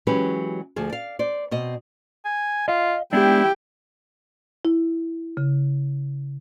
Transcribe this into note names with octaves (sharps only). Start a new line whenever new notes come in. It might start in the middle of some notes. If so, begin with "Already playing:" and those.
E3 F#3 G#3 C#4 G4 B4
D2 F3 G#4
D5 F5
C5 D5
B2 C4 D#5
G#5
F4 D#5 F5
G#3 B3 D4 E4 G4 G5
E4
C#3